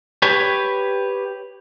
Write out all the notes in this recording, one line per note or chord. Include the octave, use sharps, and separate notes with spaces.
G4 B4 C#5